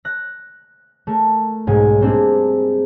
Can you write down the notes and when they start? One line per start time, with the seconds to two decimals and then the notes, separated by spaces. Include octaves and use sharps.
0.05 F#6 A#6
1.07 A3 A#4
1.67 B1 G#2 G#5
2.01 G3 A#3 C4 D4 G#4